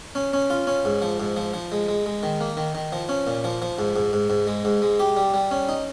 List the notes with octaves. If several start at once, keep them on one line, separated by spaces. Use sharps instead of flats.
C#4
C#4
F4
C#4
G#2
F3
G#2
F3
F3
G#3
G#3
G#3
D#3
A#3
D#3
D#3
F3
C#4
A#2
F3
F3
G#2
G#2
G#2
G#2
G#3
G#2
G#3
G4
G3
G3
C#4
D#4